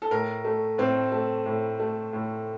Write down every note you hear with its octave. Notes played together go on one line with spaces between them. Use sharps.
A4
A2 A#4
A3
A2 C4
A3
A2
A3
A2